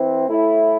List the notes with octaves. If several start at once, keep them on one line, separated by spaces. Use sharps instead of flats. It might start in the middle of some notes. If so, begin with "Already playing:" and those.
Already playing: E3 C4
A2 A3 E4